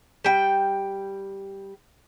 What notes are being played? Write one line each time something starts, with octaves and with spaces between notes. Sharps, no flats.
G3 G5